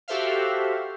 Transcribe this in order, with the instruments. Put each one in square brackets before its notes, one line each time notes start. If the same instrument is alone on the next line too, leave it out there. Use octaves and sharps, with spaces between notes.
[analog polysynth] F#4 G4 A4 C5 E5 F5